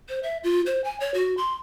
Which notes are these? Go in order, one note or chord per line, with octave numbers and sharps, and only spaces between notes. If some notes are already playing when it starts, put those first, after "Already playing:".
C5
E5
F4
C5
G#5
C#5
F#4
C6